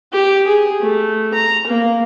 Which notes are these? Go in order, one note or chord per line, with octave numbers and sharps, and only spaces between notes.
G4
G#4
A3
A#5
A#3